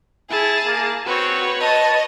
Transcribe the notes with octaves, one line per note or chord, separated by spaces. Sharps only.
E4 G#4 A5
A#3
C4 F#4 B4 C#5
D#5 A5